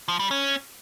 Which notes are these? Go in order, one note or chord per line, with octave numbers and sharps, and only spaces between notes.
F3
G3
C#4